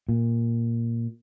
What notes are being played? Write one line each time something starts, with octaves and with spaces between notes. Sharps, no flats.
A#2